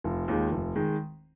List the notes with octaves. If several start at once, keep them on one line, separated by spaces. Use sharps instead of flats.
F1 F4
D#2 D#3 G#3 F4
F1
D#3 G#3